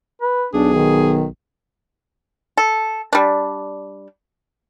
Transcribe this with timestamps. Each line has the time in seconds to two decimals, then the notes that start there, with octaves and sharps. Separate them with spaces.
0.22 B4
0.54 B1 D4 G#4
0.74 D#3
2.57 A4
3.13 G3 D4